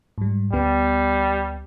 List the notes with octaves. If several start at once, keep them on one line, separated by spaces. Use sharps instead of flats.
G#2 G3
D2 G3 B3